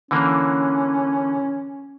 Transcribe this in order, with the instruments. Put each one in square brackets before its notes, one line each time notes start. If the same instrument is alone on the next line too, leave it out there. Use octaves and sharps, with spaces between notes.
[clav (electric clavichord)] D3 E3 A#3 [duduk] C#4